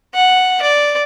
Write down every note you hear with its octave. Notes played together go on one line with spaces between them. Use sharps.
F#5
D5